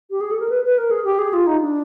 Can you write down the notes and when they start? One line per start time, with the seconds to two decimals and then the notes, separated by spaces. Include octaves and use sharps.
0.10 G4
0.21 G#4
0.31 A4
0.40 A#4
0.49 B4
0.64 B4
0.78 A#4
0.91 G#4
1.04 G4
1.19 G#4
1.33 F4
1.47 D#4
1.61 D4